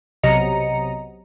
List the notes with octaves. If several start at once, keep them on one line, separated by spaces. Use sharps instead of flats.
B1 C3 F#3 D#5 A#5 C#7